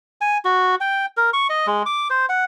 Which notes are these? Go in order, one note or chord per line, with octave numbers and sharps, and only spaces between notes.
G#5
F#4
G5
A#4
C#6
D#5
G#3
D6
C5
F#5